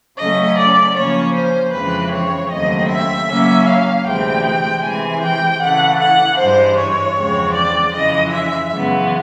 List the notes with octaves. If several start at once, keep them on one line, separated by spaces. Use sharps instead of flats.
C#3 F#3 A3 C#4 D#5
D5
C#3 F3 A#3 C#4 C#5
C5
F2 C#3 E3 G#3 C4 B4
C#5
D#2 C#3 F#3 A3 C4 D#5
E5
C#3 F#3 A#3 C#4
F5
D2 C3 E3 G#3 C4 G5
C3 E3 G#3 C4 G#5
G5
C#3 E3 A3 F#5
F#5
G2 E3 G#3 C5
C#5
E2 C#3 F3 G#3 C4
D5
F2 C#3 E3 G#3 D#5
E5
F#2 C#3 E3 G#3 B3